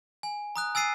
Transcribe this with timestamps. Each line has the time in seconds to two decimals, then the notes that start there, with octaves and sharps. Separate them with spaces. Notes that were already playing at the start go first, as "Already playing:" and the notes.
0.23 G#5
0.56 A#5 D#6 F#6
0.75 G#5 E6 A6 C7 D#7